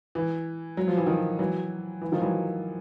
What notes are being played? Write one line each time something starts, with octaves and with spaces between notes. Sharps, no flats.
E3
F#3
F3
E3
D#3 F3
E3 F#3
E3
D#3 F3
E3 F#3